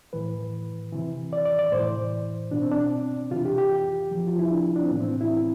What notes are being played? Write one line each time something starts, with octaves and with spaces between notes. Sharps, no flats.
A2 E3 B4
C3 E3
D5
D5
D5
A2 E3 C5
B2 D4
C4
D4
C3 E3 F4
G4
G4
C3 F3
F4
E4
D4
D4
C4
A2 E3 B3
C4
E4